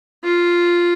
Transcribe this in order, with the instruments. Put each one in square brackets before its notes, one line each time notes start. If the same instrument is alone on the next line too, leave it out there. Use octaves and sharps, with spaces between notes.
[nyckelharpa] F4